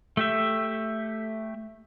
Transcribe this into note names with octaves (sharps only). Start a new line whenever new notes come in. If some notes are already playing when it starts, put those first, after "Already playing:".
A3 G4 E5